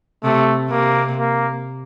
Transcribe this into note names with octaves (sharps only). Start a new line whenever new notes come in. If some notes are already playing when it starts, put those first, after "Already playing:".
C3 A3
C3 A#3
A#3